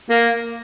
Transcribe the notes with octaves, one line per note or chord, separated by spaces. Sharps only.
A#3